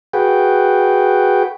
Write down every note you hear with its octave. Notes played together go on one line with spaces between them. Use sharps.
F#4 G#4 B4 G5